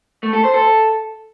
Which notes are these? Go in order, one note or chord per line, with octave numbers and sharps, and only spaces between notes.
A3
A4
C5
A4